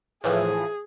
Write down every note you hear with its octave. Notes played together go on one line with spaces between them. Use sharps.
A2 E3 F3 G#4